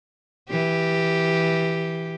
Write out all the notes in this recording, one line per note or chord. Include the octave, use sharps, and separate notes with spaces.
E3 G4